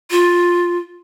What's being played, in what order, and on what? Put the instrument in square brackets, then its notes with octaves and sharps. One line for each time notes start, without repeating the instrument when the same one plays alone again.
[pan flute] F4